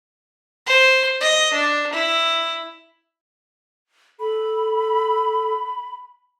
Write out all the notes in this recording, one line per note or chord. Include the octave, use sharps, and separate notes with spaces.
C5
D#5
D4
E4
A4 B5